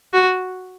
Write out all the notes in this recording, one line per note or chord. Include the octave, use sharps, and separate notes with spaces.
F#4